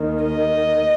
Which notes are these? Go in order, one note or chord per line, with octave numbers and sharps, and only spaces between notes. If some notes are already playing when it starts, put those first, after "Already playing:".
Already playing: D#2 D#3
D#5